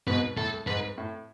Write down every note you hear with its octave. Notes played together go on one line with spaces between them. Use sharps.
G#2 B2 B4
A2 A4
G#2 B4
A2